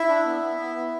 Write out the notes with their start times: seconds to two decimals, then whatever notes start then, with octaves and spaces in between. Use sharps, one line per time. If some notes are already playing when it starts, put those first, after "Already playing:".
Already playing: E4 E5
0.09 D4
0.25 B3
0.42 B3
0.59 B3
0.76 B3